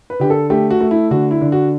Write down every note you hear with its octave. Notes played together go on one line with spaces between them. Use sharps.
B4
D3 G4
A4
A3 G4
F#4
A3
E4
D3 F#4
E4
D3
F#4